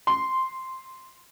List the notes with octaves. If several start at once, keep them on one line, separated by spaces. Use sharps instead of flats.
C6